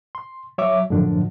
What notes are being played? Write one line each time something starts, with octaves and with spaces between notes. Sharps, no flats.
C6
F#3 C#5 E5 D6
F#2 A2 D3 F3 D4